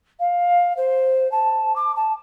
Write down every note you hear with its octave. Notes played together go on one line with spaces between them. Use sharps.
F5
C5
A5
D6
A5